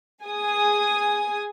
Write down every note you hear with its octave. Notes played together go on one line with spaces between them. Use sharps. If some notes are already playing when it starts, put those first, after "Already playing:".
G#4 G#5 D#6